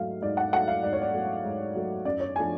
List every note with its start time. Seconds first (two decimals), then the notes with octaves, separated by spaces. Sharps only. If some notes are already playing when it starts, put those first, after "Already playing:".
Already playing: G#2 F#3 A3 F5
0.22 G#2 D5
0.37 F#5
0.53 F#3 A3 F#5
0.68 F5
0.83 G#2 D5
0.93 C#5
1.02 D5
1.14 F#3 A3
1.45 G#2
1.75 F#3 A3
2.05 F#2 D5
2.20 C#5
2.36 F3 A3 D4 G#5